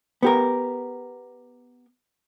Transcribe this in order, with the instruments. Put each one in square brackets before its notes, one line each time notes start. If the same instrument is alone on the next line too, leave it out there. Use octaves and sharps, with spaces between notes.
[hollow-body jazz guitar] B3 G4 A#4